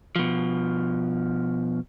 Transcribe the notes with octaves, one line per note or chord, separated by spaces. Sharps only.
B2 F3